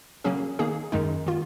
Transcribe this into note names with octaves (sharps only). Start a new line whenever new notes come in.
C#3 F#3 A#3 C#4 G#4
D#3 A#3 D#4 G#4
F#2 D#3 G#3 D#4
D#3 A#3 F4